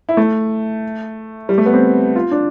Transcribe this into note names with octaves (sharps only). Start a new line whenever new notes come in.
E4
A3
G3
A3
B3
C4
F4
D4